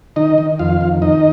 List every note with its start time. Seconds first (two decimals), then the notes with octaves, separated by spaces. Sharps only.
0.16 D#3 D#4 D#5
0.38 D#3
0.59 F2 F4 F5
0.81 D#3
1.02 D#3 D#4 D#5